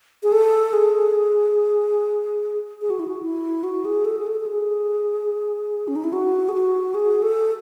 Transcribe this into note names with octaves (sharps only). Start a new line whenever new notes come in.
G#4
A4
G#4
G#4
F#4
E4
F#4
E4
F#4
G#4
A4
G#4
A4
A4
G#4
C#4
D#4
E4
F#4
G#4
F#4
G#4
A4